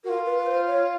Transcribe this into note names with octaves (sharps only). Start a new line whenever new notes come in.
F4 F#4 A#4
B4
B4
C5
C#5